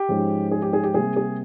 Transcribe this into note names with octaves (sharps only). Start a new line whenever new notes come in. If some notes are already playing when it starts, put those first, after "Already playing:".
Already playing: G4
G#2 F3 G#3 C#4
G#4
G4
G#4
G4
C3 G3 A#3 G#4
G#4